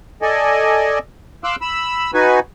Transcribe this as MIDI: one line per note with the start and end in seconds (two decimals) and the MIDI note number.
0.22 0.99 69
0.22 0.99 74
0.22 0.99 75
0.22 0.99 80
1.44 1.56 77
1.44 1.56 84
1.44 1.56 86
1.44 1.56 88
1.44 1.56 90
1.61 2.11 83
1.61 2.11 88
2.14 2.40 63
2.14 2.40 66
2.14 2.40 71
2.14 2.40 80